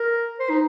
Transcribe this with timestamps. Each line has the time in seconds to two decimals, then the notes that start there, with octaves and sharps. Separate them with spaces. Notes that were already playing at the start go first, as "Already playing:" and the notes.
Already playing: A#4
0.40 C5
0.50 D#4